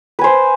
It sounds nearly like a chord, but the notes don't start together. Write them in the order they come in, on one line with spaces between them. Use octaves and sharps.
B4 G#5 C5